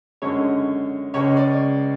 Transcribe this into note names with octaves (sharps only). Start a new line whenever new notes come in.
F#2 D3 G#3 C#4 C#5
C#2 C#3 G#3 C#4 C#5
D5